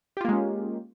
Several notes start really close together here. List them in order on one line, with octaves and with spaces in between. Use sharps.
G4 F4 A#3 G#3 C#4